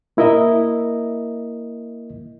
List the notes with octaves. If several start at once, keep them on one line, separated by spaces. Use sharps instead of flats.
A#3 E4 A#4 D#5 E5